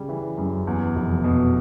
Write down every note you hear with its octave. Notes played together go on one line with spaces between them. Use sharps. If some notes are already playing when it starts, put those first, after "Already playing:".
Already playing: C#3 G3
E3
F#2
E2
F1
B2